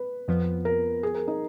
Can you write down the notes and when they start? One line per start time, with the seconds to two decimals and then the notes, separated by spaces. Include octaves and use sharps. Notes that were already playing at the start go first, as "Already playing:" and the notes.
Already playing: B4
0.28 F2 F3 B3
0.65 A#4
1.03 G#4
1.15 A#4
1.28 D#4